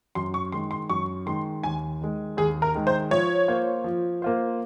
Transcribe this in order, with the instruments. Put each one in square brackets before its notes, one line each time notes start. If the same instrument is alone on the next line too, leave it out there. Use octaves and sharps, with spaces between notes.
[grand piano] F#2 [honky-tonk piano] C6
[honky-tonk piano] C#6
[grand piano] D#3 G#3 [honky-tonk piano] C6
[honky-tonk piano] C6
[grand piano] F#2 [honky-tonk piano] C#6
[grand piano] D#3 G#3 [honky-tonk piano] C6
[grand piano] D#2 [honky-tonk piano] G#5
[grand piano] D#3 G#3
[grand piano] D#2 [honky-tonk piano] G#4
[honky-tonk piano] A#4
[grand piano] D#3 G#3
[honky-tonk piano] C5
[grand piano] F3 [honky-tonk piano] C#5
[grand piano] A#3 F4 C5
F3
A#3 F4 C5